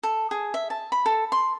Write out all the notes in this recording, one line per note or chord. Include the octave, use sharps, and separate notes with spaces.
A4
G#4
E5
A5
B5
A4
C6